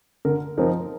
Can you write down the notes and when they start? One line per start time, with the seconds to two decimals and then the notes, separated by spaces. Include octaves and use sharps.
0.25 D3 A#4
0.57 F3 C4 D#4 A#4